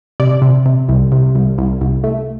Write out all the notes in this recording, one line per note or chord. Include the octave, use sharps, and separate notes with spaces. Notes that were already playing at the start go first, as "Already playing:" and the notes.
C3 D5
C3
C3
C2
C3
C2
C2
C2
A3